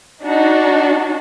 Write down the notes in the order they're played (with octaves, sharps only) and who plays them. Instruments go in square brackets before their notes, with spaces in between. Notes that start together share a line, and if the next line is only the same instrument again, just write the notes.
[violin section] D4 D#4 F#4